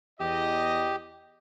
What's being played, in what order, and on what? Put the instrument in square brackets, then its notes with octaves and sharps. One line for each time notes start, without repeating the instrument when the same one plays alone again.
[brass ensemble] E2 D#5 [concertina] G4